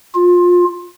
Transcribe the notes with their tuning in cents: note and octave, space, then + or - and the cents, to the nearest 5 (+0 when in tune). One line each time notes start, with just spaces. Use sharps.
F4 +25